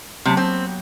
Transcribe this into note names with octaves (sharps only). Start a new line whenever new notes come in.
C3 F#3 A#3 B3
C4